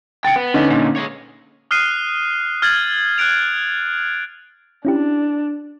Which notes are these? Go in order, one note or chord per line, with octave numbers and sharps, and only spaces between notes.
C#3 G5 A6 C#7
B3
D3 C#4 D#4
A#2
G#3 C#5
D#6 F6 F#6 C7 D#7
F6 G#6 A6 F#7
F#6 G#6 D7 F7
C#4 D4 E4 G4